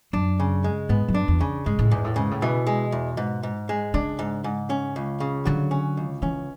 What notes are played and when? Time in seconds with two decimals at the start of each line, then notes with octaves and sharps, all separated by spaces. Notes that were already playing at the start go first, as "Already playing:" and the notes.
0.13 F#2 D4
0.40 C#3
0.64 G#3
0.89 G#2 B3
1.08 F#2
1.14 D4
1.28 E2
1.41 C#3
1.66 G#2 G#3
1.79 A2
1.91 E2 G#2
2.04 A2
2.16 G#2 C#3
2.31 A2
2.42 B2 E3
2.67 G#3
2.92 E2
3.17 G#2
3.43 G#2
3.69 G#3
3.94 C#3 D4
4.19 G#2
4.44 G#2
4.70 C#4
4.96 C#2
5.20 C#3
5.45 D3 F#3
5.71 C#4
5.97 C#2
6.22 E3 C#4